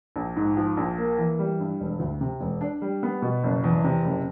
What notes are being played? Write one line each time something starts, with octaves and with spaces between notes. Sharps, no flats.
A#1
G#2
F3
A#1
A#3
E3
G3
G2
E1
D2
C3
E1
D4
G3
B3
B2
F#1
E2
C3
F#1